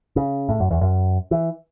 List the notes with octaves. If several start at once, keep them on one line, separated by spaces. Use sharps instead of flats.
C#3
A2
F#2
E2
F#2
E3